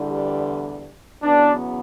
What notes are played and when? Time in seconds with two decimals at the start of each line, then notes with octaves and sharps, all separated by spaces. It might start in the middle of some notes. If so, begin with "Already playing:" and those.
Already playing: E2 D3 G3
1.23 E2 C#3 F#3 B3 D4